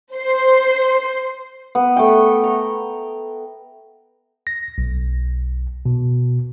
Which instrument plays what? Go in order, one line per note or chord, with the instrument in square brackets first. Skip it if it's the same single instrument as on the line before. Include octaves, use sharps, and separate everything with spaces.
[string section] C5 C7
[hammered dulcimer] B3
A3 G5
A#5
[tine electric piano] A#6
B1
B2